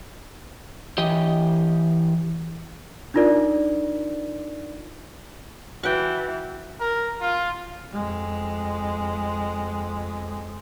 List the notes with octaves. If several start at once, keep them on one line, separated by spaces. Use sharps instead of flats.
E3 G4 D#5
D4 D#4 F4 A#4 D5
E3 F#4 B4 F#5 G5
A#4
F4
F2 G#3